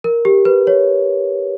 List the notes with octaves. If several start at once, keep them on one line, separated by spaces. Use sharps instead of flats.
A#4
G4
B4
C#5